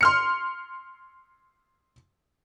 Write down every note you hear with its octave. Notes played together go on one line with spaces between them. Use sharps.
C6 F6 C#7